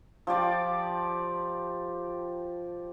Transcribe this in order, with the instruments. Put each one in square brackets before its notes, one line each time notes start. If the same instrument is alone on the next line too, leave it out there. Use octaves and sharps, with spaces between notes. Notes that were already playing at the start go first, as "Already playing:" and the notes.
[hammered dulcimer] F3 G4 D5 D6